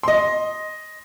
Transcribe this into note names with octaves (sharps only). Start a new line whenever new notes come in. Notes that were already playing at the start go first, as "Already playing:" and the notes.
D#5 C6